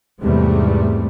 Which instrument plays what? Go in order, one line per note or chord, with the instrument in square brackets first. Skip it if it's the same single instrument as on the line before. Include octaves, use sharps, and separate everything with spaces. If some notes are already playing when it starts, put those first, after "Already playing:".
[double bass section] E2 G#2 C3 G3 A3